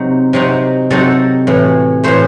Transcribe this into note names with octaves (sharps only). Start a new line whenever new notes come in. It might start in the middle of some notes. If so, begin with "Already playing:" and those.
Already playing: C3 F#3 C4 D#4
C3 F#3 C4 D#4
C3 F#3 C4 D#4 A4
A2 E3 A3
A2 E3 A3 C5